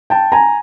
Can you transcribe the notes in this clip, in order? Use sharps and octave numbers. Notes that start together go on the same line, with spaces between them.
G5 A5
G#5 A#5